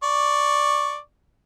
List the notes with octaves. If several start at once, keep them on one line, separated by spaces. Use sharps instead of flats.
D5 C#6